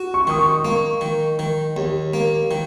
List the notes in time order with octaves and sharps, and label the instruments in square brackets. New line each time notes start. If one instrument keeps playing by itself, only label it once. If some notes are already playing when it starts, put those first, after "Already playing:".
Already playing: [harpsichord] F#4
[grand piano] C#6
[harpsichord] D#3 [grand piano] D#6
[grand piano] C#6
[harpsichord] A#3 [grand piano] C#6
[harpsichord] D#3
D#3
D#2
A#3
D#3